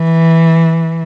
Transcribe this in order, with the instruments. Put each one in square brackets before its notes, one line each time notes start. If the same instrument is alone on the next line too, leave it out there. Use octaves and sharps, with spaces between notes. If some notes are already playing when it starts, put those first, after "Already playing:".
Already playing: [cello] E3